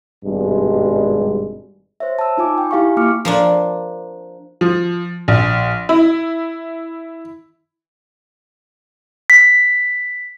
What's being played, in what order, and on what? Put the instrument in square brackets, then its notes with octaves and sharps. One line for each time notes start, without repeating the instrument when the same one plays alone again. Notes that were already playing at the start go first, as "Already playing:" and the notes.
[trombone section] G#1 G2 B2 G3 G#3
[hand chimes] C5 C#5 E5
A5 E6
D#4 F4 G#5 D6
G5
E4 G4 F5 G#5 C#6
A#3 F4 D6 F6 C#7
[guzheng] F3 A#3 D4
[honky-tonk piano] F3
A#1
E4
[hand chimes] B6